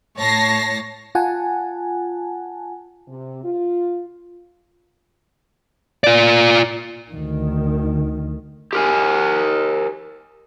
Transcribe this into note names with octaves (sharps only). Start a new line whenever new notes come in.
A2 C#5 A5 A#6 C7
F4 F#5 G#5 A5
C3
F4
F4 D5
D2 D#3
G4 A#4 G#5